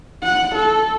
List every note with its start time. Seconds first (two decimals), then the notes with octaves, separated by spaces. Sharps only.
0.24 F#5
0.55 A4